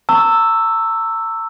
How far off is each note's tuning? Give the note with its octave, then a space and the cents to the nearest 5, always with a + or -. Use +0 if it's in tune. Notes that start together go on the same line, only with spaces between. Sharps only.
A#5 -45 C#6 +15 E6 +0